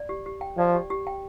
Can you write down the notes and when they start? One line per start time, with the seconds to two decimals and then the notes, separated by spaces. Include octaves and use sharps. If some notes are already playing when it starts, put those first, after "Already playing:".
Already playing: D5
0.09 G4
0.26 G4
0.41 G5
0.57 F3 D5
0.75 G4
0.90 G4
1.07 G5